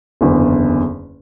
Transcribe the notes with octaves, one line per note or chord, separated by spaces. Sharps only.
F#1 E2 D3